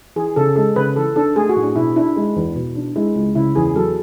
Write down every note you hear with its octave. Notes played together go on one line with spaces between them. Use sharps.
E3 G#4
C#3 A4
G#3 A4
C#3 B4
E3 A4
D4 A4
A3 G#4
F#4
A2
D4
B2 E4
D4 E4
G#3
E2
B2
D4
G#3 E4
C#2
C#3 E4
E2 G#4
F#3 A4